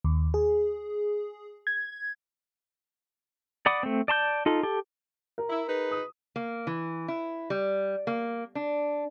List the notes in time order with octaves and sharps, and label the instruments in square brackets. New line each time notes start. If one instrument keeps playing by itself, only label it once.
[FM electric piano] D#2
G#4
G#6
[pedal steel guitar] D5 F#5 B5 D6 D#6
A3 C4
D5 A5 C6 G6
D#4 F4 A4
G4 A4
[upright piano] A#4
[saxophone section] E4
D#4 G#4 B4
[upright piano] D#6
[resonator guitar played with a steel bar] A#3
E3
E4
G3
A#3
D4